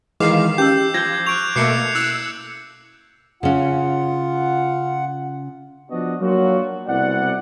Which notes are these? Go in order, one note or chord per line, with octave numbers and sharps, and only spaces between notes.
D#3 E3 G#3 F5 D6 C7
C#4 D#4 G4 B4 E6 G6
F3 G6 G#6 A#6
C#6 F#6 D7 F7
B2 A3 A#3 D6 C7 C#7
E4 E6 F#6
C#3 C#4 F4 F#5
F3 B3 D4 F#4 D#5
F#3 A#3 D4 F4 F#4
C2 B2 D5 F#5